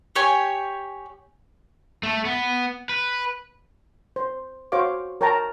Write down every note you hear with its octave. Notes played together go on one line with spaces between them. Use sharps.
G4 C#5 G#5
A3
B3
B4
C5
F#4 C5 C#5 F5 D6
A#4 C#5 G5 A5 A#5